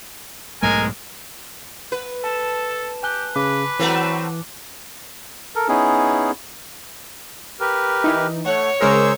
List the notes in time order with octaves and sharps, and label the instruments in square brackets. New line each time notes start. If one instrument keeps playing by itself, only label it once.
[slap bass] B1 G#2 A3 [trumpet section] G#3 A#4 G#5
[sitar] B4
[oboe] A4 [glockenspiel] A5 E7
[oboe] G4 [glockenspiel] G#5 F#6 G7
[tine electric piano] C#3 [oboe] B4 [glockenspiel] D6
[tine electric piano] E3 [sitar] F#3 A3 C4
[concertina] A4 A#4
B3 C#4 D#4 E4 G#4
[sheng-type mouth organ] G4 A#4 B4
[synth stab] E3 D#4
[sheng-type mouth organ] A3 [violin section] C#5 [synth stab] F#5
[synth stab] C#3 G#3 A#4 [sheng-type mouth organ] G#4 C5 E6